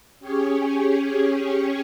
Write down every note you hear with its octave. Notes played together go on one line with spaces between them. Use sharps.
C#4 G4 G#4 C#5